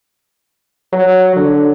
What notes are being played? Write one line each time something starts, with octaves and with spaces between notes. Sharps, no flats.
F#3
D3